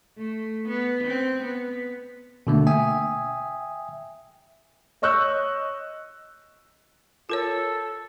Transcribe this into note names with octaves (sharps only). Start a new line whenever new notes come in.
A3
B3
C4
B3
B2 D3 A3 A#3
E5 G5 G#5 D#6
C#5 D#5 C#6 E6 F#6 G6
F4 A4 A#4 C#5